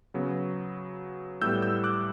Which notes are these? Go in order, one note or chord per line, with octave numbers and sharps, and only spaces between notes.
C#3 F#3 B3
A2 G3 B3 E6 G6
E6 G6
D6 F#6